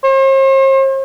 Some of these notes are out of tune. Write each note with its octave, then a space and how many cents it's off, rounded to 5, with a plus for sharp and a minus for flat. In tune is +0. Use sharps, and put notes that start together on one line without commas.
C5 +45